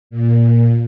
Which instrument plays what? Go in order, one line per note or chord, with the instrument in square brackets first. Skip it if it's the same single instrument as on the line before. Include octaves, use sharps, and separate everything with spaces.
[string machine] A#2